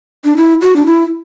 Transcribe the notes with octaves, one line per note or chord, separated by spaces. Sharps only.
D4
E4
F#4
D4
E4